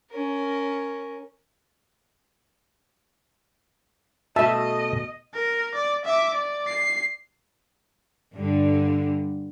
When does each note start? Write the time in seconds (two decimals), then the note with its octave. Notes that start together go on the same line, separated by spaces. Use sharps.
0.10 C#4 A#4
4.36 B2 A3 D#5 E5 A5
5.34 A#4
5.75 D5
6.05 E5 D6
6.34 D5
6.67 C7
8.36 G2 D3